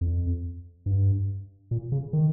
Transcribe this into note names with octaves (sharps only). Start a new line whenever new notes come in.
F2
G2
A#2
C#3
D#3